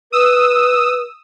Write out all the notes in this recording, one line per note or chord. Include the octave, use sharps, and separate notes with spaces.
B4 D#6 E6